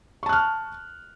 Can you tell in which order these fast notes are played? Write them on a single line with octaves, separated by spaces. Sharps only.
C#6 A5 F#6 F6